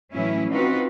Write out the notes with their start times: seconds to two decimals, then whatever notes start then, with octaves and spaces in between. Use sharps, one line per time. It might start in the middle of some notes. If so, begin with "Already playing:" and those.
0.12 A2 E3 F#3 C#4 E4
0.51 C4 D#4 F4 F#4 B4